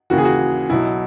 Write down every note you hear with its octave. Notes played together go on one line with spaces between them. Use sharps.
D#2 C#3 E3 F#4
G#4
F#4
B1 B2 F#3 E4